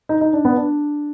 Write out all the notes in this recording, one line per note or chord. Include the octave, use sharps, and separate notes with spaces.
D#4
D#4
D4
B3
D4